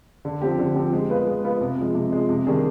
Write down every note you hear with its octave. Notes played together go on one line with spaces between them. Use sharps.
D3
F3 C4 G4
D3
F3 C4 G4
G#3
B3 F4 B4
G#3
B3 F4 B4
C3
F3 G#3
C3
F3 G#3
C3
D#3 G3 D4 G#4